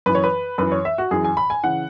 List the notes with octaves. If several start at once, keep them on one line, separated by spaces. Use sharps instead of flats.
F#2 E3 B4
C#5
B4
F#2 E3 B4
C#5
E5
F#4
F#2 E3 G#4
G#5
B5
G#5
C#3 E3 F#5